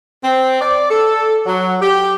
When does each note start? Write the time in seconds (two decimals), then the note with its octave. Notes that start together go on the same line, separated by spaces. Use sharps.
0.24 C4
0.61 D5
0.91 A4
1.46 F#3
1.82 G4